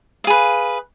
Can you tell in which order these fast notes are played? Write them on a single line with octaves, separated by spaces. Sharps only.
F5 G#4 B4